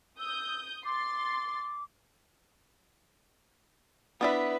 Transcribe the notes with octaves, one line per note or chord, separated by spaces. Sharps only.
D#6 E6 G6
C6 D6 A6
B3 D4 E4 B4 E5